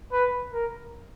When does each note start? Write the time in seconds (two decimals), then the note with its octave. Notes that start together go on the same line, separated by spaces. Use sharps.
0.12 B4
0.53 A#4